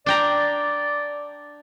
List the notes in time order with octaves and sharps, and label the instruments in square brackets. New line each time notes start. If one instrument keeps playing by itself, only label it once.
[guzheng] D4 G5 A#5 [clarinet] D5